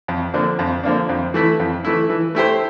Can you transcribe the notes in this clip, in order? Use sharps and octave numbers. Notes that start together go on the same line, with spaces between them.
F2
D3 F3 A#3 D4
F2
D3 F3 A#3 D4
F2
E3 A3 E4
F2
E3 A3 E4
E3
A3 E4 G4 C5